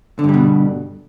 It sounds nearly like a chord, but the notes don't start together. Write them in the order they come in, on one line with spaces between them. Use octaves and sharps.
D3 G2 G3 B2